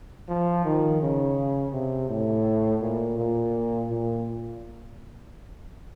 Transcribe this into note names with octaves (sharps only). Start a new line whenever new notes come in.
F3
D#3
C#3
C3
A2
A#2
A#2
A#2